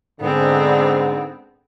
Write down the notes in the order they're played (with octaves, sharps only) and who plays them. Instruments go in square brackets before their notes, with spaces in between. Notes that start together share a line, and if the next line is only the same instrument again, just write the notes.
[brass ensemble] G#2 D3 [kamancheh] B3 C4